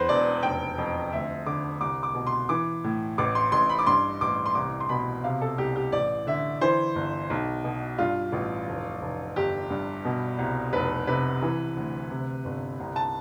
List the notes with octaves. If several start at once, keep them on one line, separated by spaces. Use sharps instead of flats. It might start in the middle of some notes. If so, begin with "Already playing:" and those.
Already playing: E2 B4 C5
E1 D5
F1 G5
F2
D2 E5
D3 D6
C2 D6
D6
B2
C6
E3 D6
A2
A1 D6
C6
A1 C6
B5
D6
G2 C6
A1 D6
C6
C2 D6
C6
B2 B5
C3 F5
A4
C2 G4
G4
A1 D5
D3 E5
E3 C5
G1
B1
B2
G2 F4
A1
F1
F1
G1 G4
G2
B2
C2
F1 B4
C3 B4
E3
D2
C3
G1
C2
A5